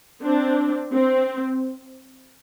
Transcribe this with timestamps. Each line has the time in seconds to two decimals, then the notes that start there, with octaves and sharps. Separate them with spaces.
0.22 C4 D4
0.92 C4